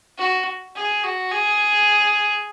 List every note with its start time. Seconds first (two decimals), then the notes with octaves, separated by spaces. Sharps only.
0.18 F#4
0.75 G#4
1.04 F#4
1.31 G#4